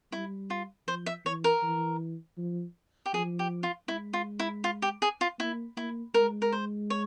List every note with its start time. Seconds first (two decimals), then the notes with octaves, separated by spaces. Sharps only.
0.12 G3 E4
0.50 F4
0.87 F3 C5
1.06 E5
1.25 E3 C#5
1.44 A#4
1.63 E3
2.38 F3
3.06 G4
3.14 F3 G#4
3.39 G4
3.63 F4
3.88 G#3 E4
4.13 F4
4.39 E4
4.64 F4
4.82 G4
5.02 G#4
5.21 F4
5.39 A#3 E4
5.77 A#3 E4
6.14 G#3 A#4
6.42 A#4
6.52 C5
6.90 C#5